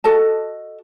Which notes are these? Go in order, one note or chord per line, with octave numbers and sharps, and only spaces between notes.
F#4 A4 D#5 A5